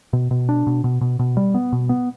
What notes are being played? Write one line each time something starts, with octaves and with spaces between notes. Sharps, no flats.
B2
B2
D4
B2
B2
B2
B2
G3
B3
B2
B3